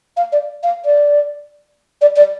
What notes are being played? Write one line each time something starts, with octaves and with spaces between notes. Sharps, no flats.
F5
D5
F5
D5
D5
D5